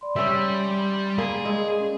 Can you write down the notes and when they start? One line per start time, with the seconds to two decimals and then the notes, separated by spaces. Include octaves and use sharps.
0.01 D5 B5 C6
0.16 G3 C#4 E5
1.18 A#3 G#4
1.45 G#3
1.80 C#4